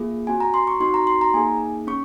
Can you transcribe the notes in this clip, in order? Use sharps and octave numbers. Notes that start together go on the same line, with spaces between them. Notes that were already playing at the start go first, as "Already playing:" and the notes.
Already playing: A#3 F4 G#4
C4 F#4 G#5
A#5
C6
C#6
C4 D#4 F#4 C6
A#5
C6
A#5
A#3 D#4 G#4 G#5
C#4 C#6